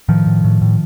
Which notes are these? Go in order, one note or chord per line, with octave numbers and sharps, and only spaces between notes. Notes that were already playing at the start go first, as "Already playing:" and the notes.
A2 D#3 F3
A2
A2
A2